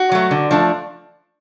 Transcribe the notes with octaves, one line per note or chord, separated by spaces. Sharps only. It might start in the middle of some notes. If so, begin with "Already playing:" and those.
Already playing: F#4
F#3 A3
D3
F3 A3 D4